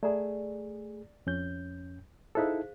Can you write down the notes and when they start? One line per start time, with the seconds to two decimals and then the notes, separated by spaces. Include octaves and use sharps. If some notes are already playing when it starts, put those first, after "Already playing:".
0.03 A3 G#4 D5 A#5
1.27 F2 C#4 G6
2.35 D#4 E4 G#4 A4 C5 F5